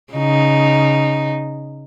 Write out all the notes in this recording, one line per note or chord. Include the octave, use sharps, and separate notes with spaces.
C#3 D#4